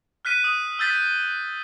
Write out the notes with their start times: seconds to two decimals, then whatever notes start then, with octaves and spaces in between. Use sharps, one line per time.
0.25 F6 F#6 B6 D#7
0.44 D#6
0.79 E6 G6 A6 B6